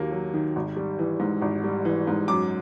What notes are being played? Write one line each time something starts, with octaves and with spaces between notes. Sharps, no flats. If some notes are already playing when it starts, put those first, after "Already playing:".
Already playing: D#2 D#3 F#3 A#3
F#3
D#3
G#1
G3
E3
G#2
G#1
G3
E3
G#2
F#2 D6